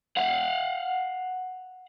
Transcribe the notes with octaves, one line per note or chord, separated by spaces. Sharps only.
F5 F#5